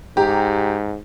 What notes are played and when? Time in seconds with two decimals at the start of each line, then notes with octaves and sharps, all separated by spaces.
0.17 G#2 G4 A#5